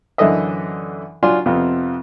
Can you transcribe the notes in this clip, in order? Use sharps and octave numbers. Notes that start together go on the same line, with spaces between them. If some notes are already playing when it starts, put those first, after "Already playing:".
F#2 D3 E3 A4 D#5 E5
F#3 D4 F4 G#5 C6
F2 C3 B3 F4